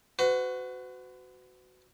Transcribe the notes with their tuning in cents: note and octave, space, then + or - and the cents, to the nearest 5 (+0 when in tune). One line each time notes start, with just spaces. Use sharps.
F#4 +0 B4 +45